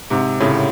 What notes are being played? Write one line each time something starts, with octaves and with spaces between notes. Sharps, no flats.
G#2 C3
A2 C#3